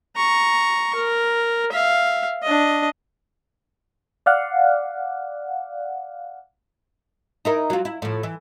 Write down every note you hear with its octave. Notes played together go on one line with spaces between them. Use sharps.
A#5 C#6
A#4
E5 F5
D4 D#5
D5 F5 F#5
D#4 E4 A#4
F#3 F4
E4
A2 F3
E3